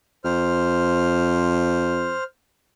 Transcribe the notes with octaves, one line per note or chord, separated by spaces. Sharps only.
F2 C5 F6